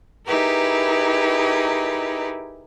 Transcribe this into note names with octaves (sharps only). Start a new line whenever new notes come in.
D#4 E4 G4 G#4 A#4 B4